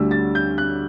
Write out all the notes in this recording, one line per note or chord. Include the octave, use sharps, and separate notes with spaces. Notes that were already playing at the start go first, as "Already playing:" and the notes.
Already playing: D2 D3 G3 E6
A6
G6
F#6